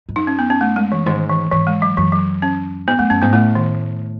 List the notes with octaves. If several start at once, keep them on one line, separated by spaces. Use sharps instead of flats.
G#2
F#2 D#4
C#4
B3
C#4
A3
G#3
E3
G#2 D#3
E3
G#2 E3
G#3
F#3
F#2 E3
F#3
C#4
G#2 B3
F#2 A3
F#2 C#4
G#2 B3
A2 A3
D#3